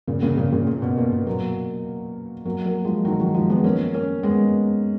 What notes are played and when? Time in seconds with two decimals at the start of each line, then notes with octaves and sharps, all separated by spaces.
0.07 A#2 C#3
0.22 A#2 C#3
0.37 A#2 C#3
0.52 A#2 C#3
0.67 A#2
0.82 B2
0.97 A#2
1.12 B2
1.27 F#3 A#3
2.45 F#3 A#3
2.66 F#3 A#3
2.85 F3 G#3
3.05 D#3 F#3
3.20 D#3 F#3
3.34 F3 G#3
3.50 G#3 B3
3.64 A#3 C#4
3.94 A#3 C#4
4.23 G#3 B3